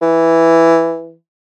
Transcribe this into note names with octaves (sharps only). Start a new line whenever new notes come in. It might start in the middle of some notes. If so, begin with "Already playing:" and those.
E3